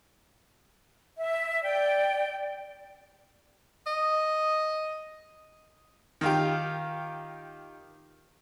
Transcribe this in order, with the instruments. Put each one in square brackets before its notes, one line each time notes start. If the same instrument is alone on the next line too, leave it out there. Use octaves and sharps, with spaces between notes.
[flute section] E5
[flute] D5 [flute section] G5
[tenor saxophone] D#5
[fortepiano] D#3 F4 G4